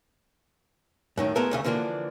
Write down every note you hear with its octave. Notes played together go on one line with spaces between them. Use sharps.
F#2 A2 D#3
G#3 A3 B3 E4 A4 A#4
D2 C#3 A3
D3 E3 F3 A#3 D4